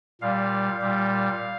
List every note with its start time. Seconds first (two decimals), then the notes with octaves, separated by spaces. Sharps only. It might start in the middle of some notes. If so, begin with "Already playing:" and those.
0.21 A#2 G3 F5
0.81 A#2 G3